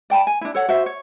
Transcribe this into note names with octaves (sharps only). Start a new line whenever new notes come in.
D5 G5 A5 B5
G#5
D4 E4
A4 C#5 F#5
F#4 C5 E5
C#5